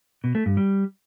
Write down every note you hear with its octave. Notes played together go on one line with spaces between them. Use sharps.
B2
A3
G2
G3